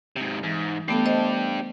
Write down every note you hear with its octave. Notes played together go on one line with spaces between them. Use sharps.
G#2 C3
G#2 E3
A3 B3 D4 G4 A4
C5 D#5 A5